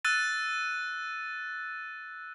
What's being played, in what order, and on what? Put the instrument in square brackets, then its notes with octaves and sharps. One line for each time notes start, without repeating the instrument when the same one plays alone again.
[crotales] E6 F#6 A6 D#7